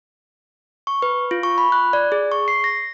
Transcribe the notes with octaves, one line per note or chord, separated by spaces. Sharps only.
C#6
B4
F4
C#6
B5
F#6
D5
G#4
C#6
C7
A#6